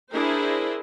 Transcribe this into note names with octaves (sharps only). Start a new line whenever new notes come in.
D4 E4 G#4 A#4 C5